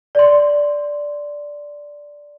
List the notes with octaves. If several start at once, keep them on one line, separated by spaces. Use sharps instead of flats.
D5 C6